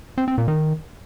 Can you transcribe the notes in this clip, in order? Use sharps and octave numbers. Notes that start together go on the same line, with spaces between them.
C4
C4
A#2
D#3